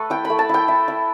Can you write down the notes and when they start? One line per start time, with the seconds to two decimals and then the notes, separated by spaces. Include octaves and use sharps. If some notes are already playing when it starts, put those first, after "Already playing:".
Already playing: A3 A4 B4
0.10 E4 G5
0.25 B5
0.30 A3
0.39 A5
0.49 E4 G5
0.68 E4
0.88 E4